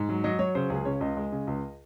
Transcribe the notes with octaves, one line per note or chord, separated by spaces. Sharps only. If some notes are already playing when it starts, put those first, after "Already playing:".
Already playing: G#2
F#3
F#3 D#5
F#3 C#5
C#3 C5
C#2 G#4
C#3 C#5
C#2 D#5
G#3
C#3
C#2